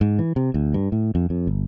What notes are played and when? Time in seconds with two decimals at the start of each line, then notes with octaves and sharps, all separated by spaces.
0.01 G#2
0.19 E3
0.36 C3
0.54 D2
0.74 G2
0.92 A2
1.15 F2
1.30 F2
1.47 G1